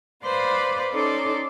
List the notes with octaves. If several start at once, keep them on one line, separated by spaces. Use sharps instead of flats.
B4 C5 D5 F5 B5
C#4 D#4 A4 D5 C6 D6